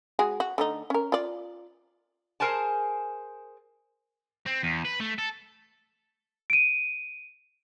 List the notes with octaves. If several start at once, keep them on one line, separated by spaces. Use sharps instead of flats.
G#3 F#4 G#4
F#4
D3 A3 D#4
C#4 A#4
F4 D5
G#4 A#4 C5 G#5 A5
C4
E2
B4
A3
A4
D7 D#7